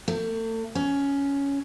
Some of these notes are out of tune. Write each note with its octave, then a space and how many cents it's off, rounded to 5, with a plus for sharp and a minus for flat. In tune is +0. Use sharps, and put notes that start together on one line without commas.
A3 +40
C#4 +10